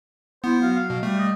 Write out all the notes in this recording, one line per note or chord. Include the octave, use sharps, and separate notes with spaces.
B3 E4 C5
F#3 F5
F5
B2
G3 A3
D#5